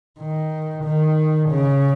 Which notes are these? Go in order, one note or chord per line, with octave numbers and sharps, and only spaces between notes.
D#3
D#3
C#3